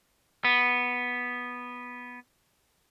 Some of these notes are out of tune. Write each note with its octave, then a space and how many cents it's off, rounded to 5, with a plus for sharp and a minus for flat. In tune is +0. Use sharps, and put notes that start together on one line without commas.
B3 -5